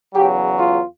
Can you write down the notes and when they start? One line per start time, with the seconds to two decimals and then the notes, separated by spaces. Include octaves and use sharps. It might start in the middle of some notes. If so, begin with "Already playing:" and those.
0.14 E2 C#3 F#3 G4
0.59 F4